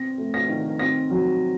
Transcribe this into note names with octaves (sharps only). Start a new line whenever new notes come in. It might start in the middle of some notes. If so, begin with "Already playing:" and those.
Already playing: C4 A#6
A3
A#6
D#3
C4 A#6
F#3